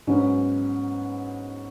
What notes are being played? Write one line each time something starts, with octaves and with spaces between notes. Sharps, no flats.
G#2 F#3 B3 C#4